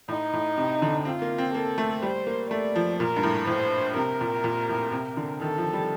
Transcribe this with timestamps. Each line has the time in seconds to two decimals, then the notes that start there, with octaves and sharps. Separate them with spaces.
0.08 A2 D#4
0.33 A2
0.58 C3
0.82 D3
1.05 C4 F4
1.22 A#3
1.38 C4
1.54 A#3 A4
1.78 A3
2.02 G3 C5
2.27 A#3
2.50 A3 D5
2.76 F3
3.00 A#2 A#4
3.16 G2
3.23 A2
3.47 A2 C5
3.96 C3 A#4
4.21 A#2
4.44 A#2
4.69 A2
4.92 C3
5.17 D3
5.41 D#3 A4
5.58 F3
5.73 G3